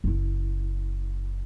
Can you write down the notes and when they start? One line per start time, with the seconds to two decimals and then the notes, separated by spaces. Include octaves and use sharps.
0.04 F#1 E4